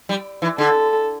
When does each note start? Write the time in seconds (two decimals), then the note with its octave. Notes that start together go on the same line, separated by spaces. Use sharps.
0.09 G3
0.42 E3
0.58 D3 A4